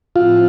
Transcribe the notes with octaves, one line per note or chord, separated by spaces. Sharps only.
A2 F3 C4 E4 F4